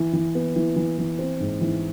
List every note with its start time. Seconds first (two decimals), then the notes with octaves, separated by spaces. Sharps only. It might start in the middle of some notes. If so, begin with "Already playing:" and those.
Already playing: E3
0.13 E3
0.35 B3
0.56 E3
0.76 E3
0.98 E3
1.19 C4
1.40 G#2
1.61 E3